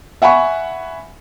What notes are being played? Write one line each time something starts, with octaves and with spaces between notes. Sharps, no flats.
E5 F#5 G#5 B5 C#6